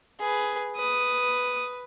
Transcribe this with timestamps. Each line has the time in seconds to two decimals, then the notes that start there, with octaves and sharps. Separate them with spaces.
0.20 G#4 B4
0.77 B4 D#6